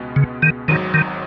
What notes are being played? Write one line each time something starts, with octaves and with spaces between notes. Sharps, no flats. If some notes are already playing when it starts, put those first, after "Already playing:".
Already playing: C#2 B2 G#3 B3
C#3
D#3
G#1 G#2 D#3 F#3
D#3